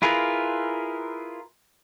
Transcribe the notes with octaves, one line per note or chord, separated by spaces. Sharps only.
E4 F4 G#4 A#4 B4